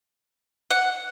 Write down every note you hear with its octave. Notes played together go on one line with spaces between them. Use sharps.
F#5